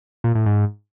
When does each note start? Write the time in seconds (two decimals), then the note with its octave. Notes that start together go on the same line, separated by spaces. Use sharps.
0.24 A#2
0.35 A2
0.46 G#2